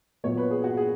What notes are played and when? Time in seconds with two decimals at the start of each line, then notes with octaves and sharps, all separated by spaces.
0.24 A#2 F#3 B3 C#5
0.37 B4
0.51 G#4
0.64 F#4
0.77 G#4